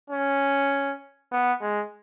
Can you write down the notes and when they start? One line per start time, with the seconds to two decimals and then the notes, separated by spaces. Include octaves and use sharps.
0.10 C#4
1.32 B3
1.62 G#3